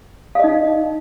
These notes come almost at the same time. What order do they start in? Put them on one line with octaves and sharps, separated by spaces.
F5 D#5 D#4